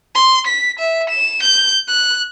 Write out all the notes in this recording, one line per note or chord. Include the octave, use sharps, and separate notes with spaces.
C6
B6
E5
E7
G6
F#6